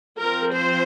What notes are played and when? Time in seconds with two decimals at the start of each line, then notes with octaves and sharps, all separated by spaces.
0.18 F3 C4 A#4
0.52 C5